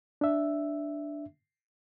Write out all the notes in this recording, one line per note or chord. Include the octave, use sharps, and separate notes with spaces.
D4 E5